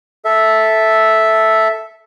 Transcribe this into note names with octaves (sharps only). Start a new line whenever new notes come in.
A4 E5